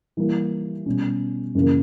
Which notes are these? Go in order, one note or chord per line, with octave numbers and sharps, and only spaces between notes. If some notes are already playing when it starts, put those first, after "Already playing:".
E3 G3 A#3 E4
B2 G3 C#4
F#2 C#3 E3 A#3